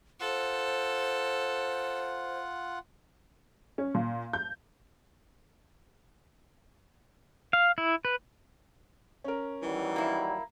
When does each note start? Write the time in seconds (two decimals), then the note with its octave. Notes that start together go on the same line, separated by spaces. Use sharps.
0.20 F4 A4 C5 F#5
3.78 C#4
3.94 A#2
4.33 G6
7.53 F5
7.78 E4
8.05 B4
9.24 C#4 A#4
9.62 D#3 E3 F#3 G3
9.96 A#3 E4